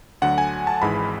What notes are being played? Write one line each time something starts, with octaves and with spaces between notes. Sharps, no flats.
D2 D3 F#3 F#5
G#5
A5
G#1 G#2 E3 G#3 B5